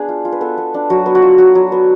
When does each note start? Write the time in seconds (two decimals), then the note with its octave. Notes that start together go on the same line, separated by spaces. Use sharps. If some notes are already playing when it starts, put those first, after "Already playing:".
Already playing: B3 D4 G#4
0.09 F4
0.25 F4
0.32 B4
0.41 B3 A4
0.58 B3
0.74 D4
0.90 F#3 F#4
1.06 B3
1.15 F#4
1.22 F4
1.38 F#3 F#4
1.55 F#3
1.72 B3